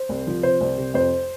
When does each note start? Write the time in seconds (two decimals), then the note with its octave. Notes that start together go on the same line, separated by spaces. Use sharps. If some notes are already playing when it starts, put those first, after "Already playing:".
Already playing: C5
0.09 C2
0.27 F3
0.43 C3 C5
0.61 C2
0.77 C3
0.94 F2 C5